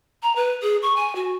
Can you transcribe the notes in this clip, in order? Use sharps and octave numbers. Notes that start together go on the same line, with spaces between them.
A#5
B4
G#4
C#6
G#5
F#4